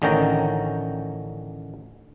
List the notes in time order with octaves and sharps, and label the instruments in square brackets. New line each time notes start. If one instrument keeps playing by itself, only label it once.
[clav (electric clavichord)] A1 D3 D#3 C#4 G5 A#5